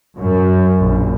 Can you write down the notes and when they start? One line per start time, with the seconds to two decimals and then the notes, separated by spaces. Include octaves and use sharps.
0.19 F#2
0.80 A#1